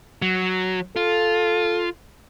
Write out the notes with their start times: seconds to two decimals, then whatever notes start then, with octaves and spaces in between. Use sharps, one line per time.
0.22 F#3
0.96 F4 A4